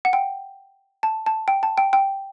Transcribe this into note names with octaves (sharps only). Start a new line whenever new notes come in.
F#5
G5
A5
A5
G5
A5
G5
G5